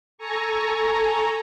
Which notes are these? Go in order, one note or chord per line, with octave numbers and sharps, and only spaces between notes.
A4 G#5 A#5 C#6